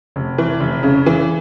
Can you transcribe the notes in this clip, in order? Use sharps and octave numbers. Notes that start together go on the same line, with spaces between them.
F1
E3
F1
C#3
E3